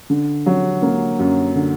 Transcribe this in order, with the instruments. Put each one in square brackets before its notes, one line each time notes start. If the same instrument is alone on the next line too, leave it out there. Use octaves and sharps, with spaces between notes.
[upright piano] D3
F#3
A#3
F#2
D3